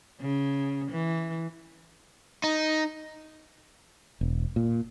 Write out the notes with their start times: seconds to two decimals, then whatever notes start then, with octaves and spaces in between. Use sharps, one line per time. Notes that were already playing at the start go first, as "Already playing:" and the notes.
0.21 C#3
0.92 E3
2.44 D#4
4.21 E1
4.56 A#2